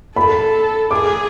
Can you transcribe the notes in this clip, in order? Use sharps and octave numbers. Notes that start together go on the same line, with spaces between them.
A4 B5
G#4 D6